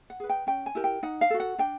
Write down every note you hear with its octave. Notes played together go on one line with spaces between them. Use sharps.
F#5
G#4 B4
G5
C#4 G5
G#5
E4 G4 A#4
G5
D#4 F#5
F5
F#4 A4
F#5
D4 G5